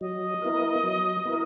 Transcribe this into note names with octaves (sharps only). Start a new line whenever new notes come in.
F#3 D#5
B3 E4 A#4
F#3
B3 E4 A#4